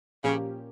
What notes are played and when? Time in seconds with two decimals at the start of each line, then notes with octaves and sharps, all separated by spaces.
0.24 A#2 C#3 F3 A#3 C#4 G4